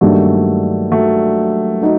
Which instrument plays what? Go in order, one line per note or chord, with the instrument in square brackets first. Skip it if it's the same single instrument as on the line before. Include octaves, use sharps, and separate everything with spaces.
[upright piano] G2 D#3 G3 A#3 [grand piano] F#3 A3
[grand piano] F#3 A3
[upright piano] D#4 F#4